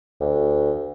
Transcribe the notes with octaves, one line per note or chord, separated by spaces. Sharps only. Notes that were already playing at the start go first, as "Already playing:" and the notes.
D2